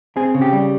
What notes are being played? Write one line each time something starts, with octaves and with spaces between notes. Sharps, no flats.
C4 G#4
C#3
G4
G3